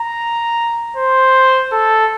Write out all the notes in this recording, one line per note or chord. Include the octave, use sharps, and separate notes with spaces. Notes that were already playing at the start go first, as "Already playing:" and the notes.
Already playing: A#5
C5
A4